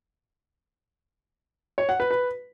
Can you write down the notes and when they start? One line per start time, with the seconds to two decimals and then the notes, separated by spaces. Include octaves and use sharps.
1.78 C#5
1.89 F#5
2.00 B4
2.11 B4